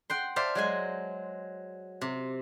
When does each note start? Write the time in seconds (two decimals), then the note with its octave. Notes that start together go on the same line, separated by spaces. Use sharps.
0.10 F#5 G5 C6
0.36 C5 D5 E5 F5 A5
0.55 F#3 G#3 G#5
2.01 C3